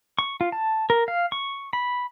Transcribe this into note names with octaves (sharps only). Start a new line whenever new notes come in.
C#6
F4
A5
A#4
F5
C#6
B5